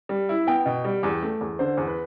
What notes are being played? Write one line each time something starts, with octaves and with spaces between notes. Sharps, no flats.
G3
E4
B3 G5
B2
G3
E2
A3
E2
D3 C5
E2
B4